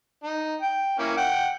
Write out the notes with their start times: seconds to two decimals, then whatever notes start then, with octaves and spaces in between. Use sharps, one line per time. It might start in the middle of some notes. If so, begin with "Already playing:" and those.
0.23 D#4
0.62 G5
0.99 A#3 C#4 E4
1.17 F#5 G5